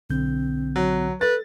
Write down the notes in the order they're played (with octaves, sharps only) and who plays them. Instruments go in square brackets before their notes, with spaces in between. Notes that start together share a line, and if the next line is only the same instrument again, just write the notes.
[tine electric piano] B1 D3 G6 [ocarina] C4
[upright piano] F#3
[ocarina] A4 [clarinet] B4 [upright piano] A6